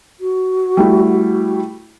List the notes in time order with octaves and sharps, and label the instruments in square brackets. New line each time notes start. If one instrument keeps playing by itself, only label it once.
[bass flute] F#4
[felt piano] G3 A3 E4